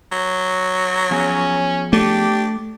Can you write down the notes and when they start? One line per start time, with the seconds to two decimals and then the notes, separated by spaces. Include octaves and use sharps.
0.12 F#3
1.11 F3 B3 C#4 G#4
1.93 A3 D4 G4